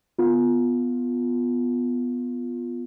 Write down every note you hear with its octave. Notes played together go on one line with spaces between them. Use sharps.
B3 F4